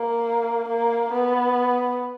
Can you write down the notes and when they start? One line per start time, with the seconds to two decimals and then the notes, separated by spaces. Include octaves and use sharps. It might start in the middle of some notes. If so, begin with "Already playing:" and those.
Already playing: A#3
0.68 A#3
1.12 B3